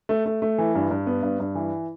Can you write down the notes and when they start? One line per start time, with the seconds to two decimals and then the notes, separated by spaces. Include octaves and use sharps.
0.09 A3
0.25 A3
0.42 A3
0.58 E3
0.75 G2
0.91 G2
1.07 B3
1.23 G2
1.40 G2
1.55 E3